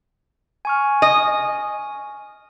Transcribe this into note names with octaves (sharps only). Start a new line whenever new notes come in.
G#5 C#6 F6
D#5